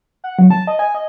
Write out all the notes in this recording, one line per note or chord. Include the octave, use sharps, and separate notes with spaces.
F#5
F#3
A5
D#5
G#5
D#5